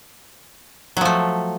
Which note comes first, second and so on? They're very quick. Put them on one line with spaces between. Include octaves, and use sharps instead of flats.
F#3 F3 A3